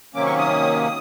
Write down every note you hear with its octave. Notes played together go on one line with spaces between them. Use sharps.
C3 D#3 F#3 A#3 C#4 D6
C#6
D#6